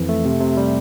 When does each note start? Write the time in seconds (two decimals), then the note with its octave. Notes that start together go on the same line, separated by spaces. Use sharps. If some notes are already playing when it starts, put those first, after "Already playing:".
Already playing: F2 E3
0.09 A3
0.25 C3
0.41 C3
0.57 G3